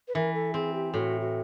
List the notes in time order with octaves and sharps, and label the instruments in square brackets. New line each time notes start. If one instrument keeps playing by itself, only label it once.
[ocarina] B4
[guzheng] E3 [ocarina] A#4
[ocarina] A4
[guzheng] C4 [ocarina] G#4
[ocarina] G4
[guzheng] A2 [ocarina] F#4
[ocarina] F#4